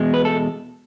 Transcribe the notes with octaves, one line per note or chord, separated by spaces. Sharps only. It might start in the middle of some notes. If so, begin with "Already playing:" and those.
Already playing: E2 B2 G#3
B4
A4